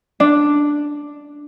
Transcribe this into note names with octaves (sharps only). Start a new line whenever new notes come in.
D4